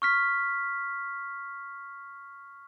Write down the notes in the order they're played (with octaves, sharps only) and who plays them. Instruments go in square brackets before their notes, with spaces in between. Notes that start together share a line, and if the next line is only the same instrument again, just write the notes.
[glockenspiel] C#6 F6 B6